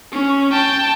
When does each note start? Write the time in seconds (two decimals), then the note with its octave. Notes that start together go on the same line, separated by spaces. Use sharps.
0.12 C#4
0.52 G5 A5